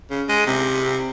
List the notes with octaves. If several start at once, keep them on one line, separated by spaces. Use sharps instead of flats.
C#3
G#3
C3